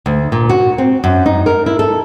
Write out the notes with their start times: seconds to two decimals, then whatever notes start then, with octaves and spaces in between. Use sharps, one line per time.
0.06 D2
0.32 A#2
0.49 F#4
0.78 C4
1.04 F#2
1.26 D#4
1.46 A#4
1.66 E4
1.79 A4